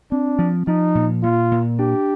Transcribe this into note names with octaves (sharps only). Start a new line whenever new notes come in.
C4 D4
F3
F3 D#4
A#2
A#2 F4
A#2
D4 G4